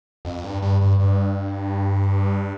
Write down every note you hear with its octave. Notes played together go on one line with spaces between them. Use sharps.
F2
G2
G2
G2
G2